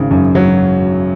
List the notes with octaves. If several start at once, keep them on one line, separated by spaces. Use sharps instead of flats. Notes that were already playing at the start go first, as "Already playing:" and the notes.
Already playing: G#1 C#3
F#2
F#3